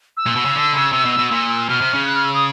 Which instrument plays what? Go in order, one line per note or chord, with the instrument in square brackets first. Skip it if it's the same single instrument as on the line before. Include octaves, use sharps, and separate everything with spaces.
[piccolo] E6
[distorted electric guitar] A#2
B2
C#3
D3
C#3
C3
B2
B2
A#2
[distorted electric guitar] B2 [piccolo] F6
[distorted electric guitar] C3
C#3
[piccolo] F#6
F6
E6
D#6